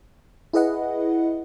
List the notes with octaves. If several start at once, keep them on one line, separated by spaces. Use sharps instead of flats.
E4 G#4 B4 D#5 F#5